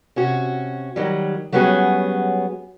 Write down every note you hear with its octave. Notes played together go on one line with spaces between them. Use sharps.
C3 C#4 F#4
D#3 F#3 G3
F#3 G3 B3 C#4 F#4 G#4